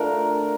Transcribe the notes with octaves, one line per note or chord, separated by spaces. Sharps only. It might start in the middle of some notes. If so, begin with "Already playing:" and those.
Already playing: A3 D4 F4 A#4